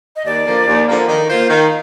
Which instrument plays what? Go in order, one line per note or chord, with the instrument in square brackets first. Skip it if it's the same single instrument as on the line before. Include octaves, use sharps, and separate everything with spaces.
[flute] D#5
[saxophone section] D#2 [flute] D5
[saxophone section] D3 F3 A#3
D#2
D3 F3 A#3
[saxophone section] D#3 [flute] D#5
[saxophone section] A#3 F4 C5 [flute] F5
[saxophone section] D#3 [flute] F5